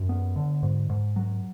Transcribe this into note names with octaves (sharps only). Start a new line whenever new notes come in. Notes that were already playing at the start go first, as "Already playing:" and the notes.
Already playing: F#2
B3
D3
G#2
G#2
F#3